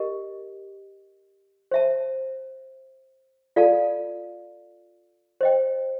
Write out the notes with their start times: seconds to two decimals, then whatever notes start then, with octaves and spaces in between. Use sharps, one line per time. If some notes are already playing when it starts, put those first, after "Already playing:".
Already playing: G4 A#4 D#5
1.71 C5 E5 A5
3.56 F4 A4 D5 F5 A5
5.41 C5 D#5 G5